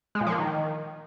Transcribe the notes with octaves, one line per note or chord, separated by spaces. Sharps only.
G#3
A#2
F3
A#3
D#3